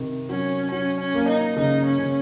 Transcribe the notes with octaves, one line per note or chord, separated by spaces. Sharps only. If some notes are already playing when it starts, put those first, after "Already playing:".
Already playing: C3 D#3
F#3 C#4
F#3 C#4
C#4
A#3
D#4
C#3 D#4
C#4
C#3